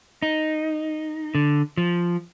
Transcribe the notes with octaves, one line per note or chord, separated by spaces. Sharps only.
D#4
D3
F3